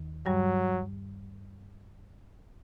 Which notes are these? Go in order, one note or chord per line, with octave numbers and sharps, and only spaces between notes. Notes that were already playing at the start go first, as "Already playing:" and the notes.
Already playing: D#2 D#3
G2 F#3 G3